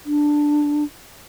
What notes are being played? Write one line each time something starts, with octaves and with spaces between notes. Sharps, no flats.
D4